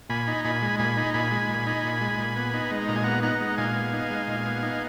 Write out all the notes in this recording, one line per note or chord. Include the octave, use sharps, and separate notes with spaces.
A#2 G#5 B5
D#4
A#2 G#5 B5
G#3
A#2 G#5 B5
D#4
A#2 G#5 B5
G#3
A#2
D#4
A#2
G#3
A#2
B3
D#4
G#3
A#2 A#5
G#5
B3 F#5 A#5
D#4 F#5 A#5
G#3
A#2 F5 G#5
B3
D#4
G#3
A#2
B3
D#4